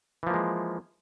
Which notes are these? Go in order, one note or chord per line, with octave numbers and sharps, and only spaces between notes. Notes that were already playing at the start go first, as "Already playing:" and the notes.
E3 F3 G#3 A#3